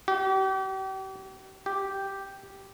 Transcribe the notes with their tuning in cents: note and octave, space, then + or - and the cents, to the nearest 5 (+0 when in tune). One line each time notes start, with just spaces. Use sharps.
G4 -40
G4 -5